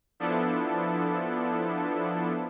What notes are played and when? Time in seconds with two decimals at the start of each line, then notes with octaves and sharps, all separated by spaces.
0.20 F3 B3 D4 E4 A4